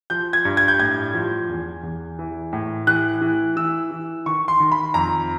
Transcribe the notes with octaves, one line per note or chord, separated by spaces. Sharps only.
F3 G6
G#6
G2
G#6
G6
A2 G#6
F3
E2
E2
E3
A2
E3 F#6
E3
E3 E6
E3
D#3 C#6
C6
D#3
B5
F2 A#5